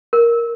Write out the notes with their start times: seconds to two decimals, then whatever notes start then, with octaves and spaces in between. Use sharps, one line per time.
0.13 A#4